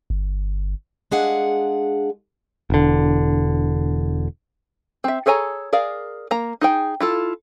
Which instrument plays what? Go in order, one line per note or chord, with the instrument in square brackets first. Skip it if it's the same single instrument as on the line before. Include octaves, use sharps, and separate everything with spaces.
[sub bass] G1
[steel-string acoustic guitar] G#3 D4 G#4 F5 F#5
[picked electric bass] E1 D3
[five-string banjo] C4 E5
G#4 A4 C#5 G#5 A#5
G#4 A#4 D5 F5
A#3 A#5
D#4 G#4 G5
E4 F4 A4